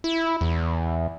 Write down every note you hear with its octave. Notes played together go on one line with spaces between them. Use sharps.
E4
E2